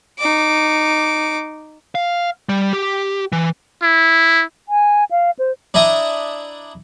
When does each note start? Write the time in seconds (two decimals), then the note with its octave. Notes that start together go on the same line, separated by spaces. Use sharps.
0.19 D#4 D6
1.95 F5
2.49 G3
2.73 G4
3.32 E3
3.82 E4
4.69 G#5
5.11 F5
5.39 C5
5.74 D4 E4 D#5 E5 A#5